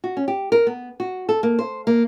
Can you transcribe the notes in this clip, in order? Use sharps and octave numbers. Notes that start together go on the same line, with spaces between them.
F#4
C#4
G4
A#4
B3
F#4
A4
A#3
C5
A#3